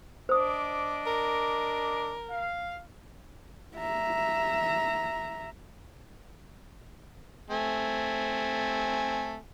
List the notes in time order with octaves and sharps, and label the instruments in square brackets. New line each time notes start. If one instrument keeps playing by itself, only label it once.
[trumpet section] D4 D#5 D6 [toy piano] C5 D#6
[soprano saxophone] A#4
[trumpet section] F5
[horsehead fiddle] E5 A#5
[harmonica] A3 C4 G#5